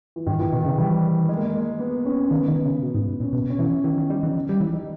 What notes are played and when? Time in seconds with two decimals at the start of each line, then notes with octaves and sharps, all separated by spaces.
0.16 E3
0.27 G2 D#3
0.39 A#2 E3
0.52 B2 D#3
0.66 C#3
0.78 E3 G3
1.29 G#3
1.37 A#3
1.44 G#3
1.54 A#3
1.80 B3
2.05 C#4
2.24 C#4
2.31 D#3 B3
2.48 D#3
2.66 C#3
2.83 B2
2.95 G#2
3.20 A#2 C#4
3.33 B2 B3
3.50 C#4
3.59 E3
3.84 D#3 E3
3.97 D#3 E3
4.10 G3 D#4
4.23 E3 C#4
4.35 D#4
4.48 G3 G4
4.60 E3
4.73 D#4